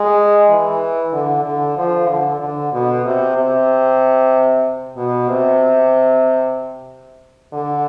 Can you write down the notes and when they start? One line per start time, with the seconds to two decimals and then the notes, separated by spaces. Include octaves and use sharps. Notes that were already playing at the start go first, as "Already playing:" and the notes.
Already playing: G#3
0.50 E3
1.13 D3
1.44 D3
1.77 F3
2.08 D3
2.41 D3
2.73 B2
3.05 C3
3.36 C3
4.97 B2
5.29 C3
7.53 D3